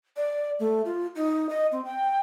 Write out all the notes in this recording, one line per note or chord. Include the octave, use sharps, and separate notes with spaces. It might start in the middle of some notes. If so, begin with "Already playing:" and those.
D5
A3
F4
D#4
D#5
C4
G5